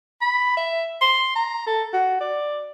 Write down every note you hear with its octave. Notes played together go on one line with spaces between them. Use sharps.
B5
E5
C6
A#5
A4
F#4
D5